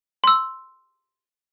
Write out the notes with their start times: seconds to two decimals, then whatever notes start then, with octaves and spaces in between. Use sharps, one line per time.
0.24 C6 E6